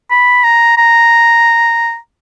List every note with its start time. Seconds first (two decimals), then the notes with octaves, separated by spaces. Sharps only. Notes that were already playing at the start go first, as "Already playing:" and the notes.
0.11 B5
0.44 A#5
0.77 A#5